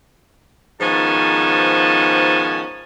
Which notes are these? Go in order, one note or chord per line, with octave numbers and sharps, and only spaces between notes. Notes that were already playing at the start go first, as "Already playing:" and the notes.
G#2 D#3 F3 B3 C#4 A5